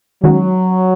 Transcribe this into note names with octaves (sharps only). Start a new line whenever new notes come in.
D#3 F#3 G#3 C#4 F#4